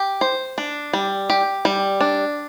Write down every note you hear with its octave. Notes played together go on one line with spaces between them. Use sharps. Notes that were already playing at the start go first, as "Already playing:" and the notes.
Already playing: G4
C5
D4
G3
G4
G3
D4